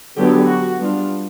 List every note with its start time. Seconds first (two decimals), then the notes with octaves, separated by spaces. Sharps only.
0.16 D3 F#3 B3 G4
0.46 F#4
0.78 G3 B3 D4 F4